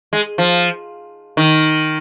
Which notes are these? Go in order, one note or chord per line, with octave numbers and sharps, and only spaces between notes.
G#3
F3
D#3